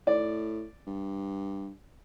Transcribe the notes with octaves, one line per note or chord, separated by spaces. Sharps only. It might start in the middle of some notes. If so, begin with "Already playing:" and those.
A2 D5
G2